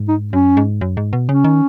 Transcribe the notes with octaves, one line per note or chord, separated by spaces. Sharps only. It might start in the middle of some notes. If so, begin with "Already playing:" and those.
Already playing: G#2
D#4
F#2 C#4
G#2
F#2
G#2
B2
C#3 C#4
D#3